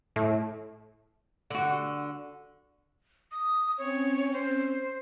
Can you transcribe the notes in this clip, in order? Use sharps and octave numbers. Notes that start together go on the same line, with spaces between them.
A2
D3 F#4
D#6
C4 C#4 C#5
C5